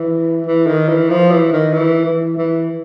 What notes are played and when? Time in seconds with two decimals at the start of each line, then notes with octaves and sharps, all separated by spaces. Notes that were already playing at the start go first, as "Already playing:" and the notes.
Already playing: E3
0.46 E3
0.67 D#3
0.89 E3
1.10 F3
1.31 E3
1.52 D#3
1.73 E3
2.05 E3
2.37 E3